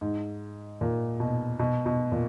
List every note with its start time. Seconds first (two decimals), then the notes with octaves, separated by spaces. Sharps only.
0.01 G#2
0.81 A#2
1.20 B2
1.59 B2
1.86 B2
2.12 A#2